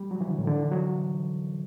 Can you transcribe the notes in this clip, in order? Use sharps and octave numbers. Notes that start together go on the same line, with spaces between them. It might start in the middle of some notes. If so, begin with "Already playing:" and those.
Already playing: G3
F#3
E3
D3
A2
D3
E3
F#3